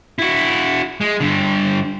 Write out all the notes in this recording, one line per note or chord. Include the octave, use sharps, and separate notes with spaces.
E4 F#4
G#3
G2 D3